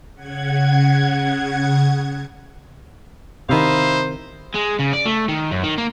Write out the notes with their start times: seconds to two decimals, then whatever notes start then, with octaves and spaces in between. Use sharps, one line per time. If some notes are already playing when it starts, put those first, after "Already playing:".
0.14 C#3 F#5 G#6
3.49 C3 D#3 D#4 E4 C5 F5
4.55 G#3
4.80 C#3
4.93 D5
5.06 A3
5.28 D#3
5.51 F#2
5.64 D#3
5.78 A#3